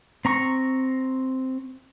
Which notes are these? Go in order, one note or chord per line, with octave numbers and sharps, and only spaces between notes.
C4 A#5 C#6